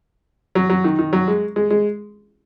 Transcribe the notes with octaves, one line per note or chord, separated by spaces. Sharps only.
F#3
F#3
D#3
D#3
F#3
G#3
G#3
G#3